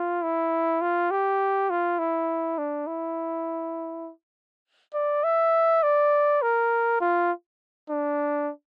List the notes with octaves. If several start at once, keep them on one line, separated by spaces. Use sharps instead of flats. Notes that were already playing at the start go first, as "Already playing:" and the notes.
Already playing: F4
E4
F4
G4
F4
E4
D4
E4
D5
E5
D5
A#4
F4
D4